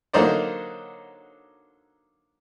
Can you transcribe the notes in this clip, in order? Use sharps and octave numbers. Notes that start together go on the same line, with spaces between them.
D3 F#3 A#3 D#4 C5 D5